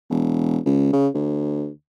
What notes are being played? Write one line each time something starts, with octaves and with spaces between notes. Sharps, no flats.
E1
C#2
C#3
D2